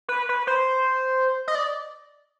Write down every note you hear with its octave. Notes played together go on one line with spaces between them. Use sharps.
B4
B4
C5
D#5
D5